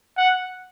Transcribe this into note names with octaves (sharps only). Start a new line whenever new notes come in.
F#5